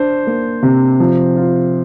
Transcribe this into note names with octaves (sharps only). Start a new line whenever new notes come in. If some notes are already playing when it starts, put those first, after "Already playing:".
Already playing: D4 C5
A#3
C3
F3
F4